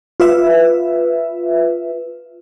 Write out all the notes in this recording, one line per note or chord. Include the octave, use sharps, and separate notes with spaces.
F4 B4 E5